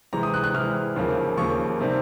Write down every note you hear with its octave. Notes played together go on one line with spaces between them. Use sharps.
C3 E3 G#3 A#5
D#6
F#6
F#6
C3 E3 G#3 F6
D#2 C#3 F3 A#3
D#2 C#3 F3 A#3 C#6
C3 D#3 G3 C4